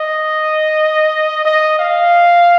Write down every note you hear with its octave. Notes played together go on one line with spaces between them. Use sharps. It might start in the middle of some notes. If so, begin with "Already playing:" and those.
Already playing: D#5
D#5
F5